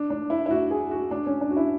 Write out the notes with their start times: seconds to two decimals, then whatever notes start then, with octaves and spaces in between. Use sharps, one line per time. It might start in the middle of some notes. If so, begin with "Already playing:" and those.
Already playing: D4
0.10 D4
0.30 E4
0.46 E4
0.51 F#4
0.71 G#4
0.91 F#4
1.11 D4
1.26 C#4
1.41 D4
1.50 F#4
1.57 E4